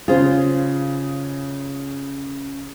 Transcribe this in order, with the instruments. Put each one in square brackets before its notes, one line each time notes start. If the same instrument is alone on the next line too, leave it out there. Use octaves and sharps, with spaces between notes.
[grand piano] C#3 G#4 [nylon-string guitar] F4 C5